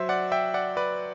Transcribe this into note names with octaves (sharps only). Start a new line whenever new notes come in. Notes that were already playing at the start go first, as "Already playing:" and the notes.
Already playing: F#3 C5 E5
D5 F#5
E5 G5
D5 F#5
B4 D5